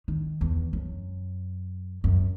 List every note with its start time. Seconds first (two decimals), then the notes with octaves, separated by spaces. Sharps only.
0.08 D#3
0.41 E2
0.73 F#2
2.04 F#2